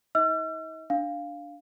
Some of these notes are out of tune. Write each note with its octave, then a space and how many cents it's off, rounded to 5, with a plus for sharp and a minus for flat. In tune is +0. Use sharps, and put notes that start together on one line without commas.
D#4 +45 D#5 +45 E6 +45
D4 +0 F5 +0